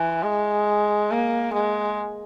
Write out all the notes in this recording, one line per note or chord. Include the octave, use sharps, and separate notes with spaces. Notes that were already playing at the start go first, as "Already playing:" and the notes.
Already playing: E3
G#3
A#3
G#3